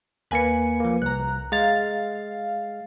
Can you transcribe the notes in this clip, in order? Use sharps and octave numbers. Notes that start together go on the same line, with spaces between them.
D#2 A#3 B4 G#5 C#7
F3 A#3
C2 A#5 F#6
G#3 F5 A6